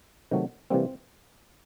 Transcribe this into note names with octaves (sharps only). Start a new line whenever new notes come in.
C3 D#3 F#3 A3
C3 E3 G3 A#3 C4